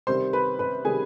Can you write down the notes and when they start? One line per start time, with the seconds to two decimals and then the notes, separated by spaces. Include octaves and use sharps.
0.07 C3 D#3 G3 C5 C6
0.33 B4 B5
0.59 B4 B5
0.85 C3 D#3 G3 G#4 G#5